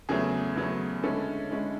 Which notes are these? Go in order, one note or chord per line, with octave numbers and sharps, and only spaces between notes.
E2 C#3 F#3 A3 G#4
E2 C#3 F#3 A3
D3 G#3 C#4 E4 A4
D3 G#3 C#4 E4